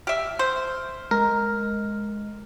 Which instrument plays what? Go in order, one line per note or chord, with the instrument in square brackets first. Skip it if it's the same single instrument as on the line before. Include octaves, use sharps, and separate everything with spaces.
[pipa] G4 E5 [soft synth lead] F6
[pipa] C5
[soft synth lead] G#3 [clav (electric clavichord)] A#4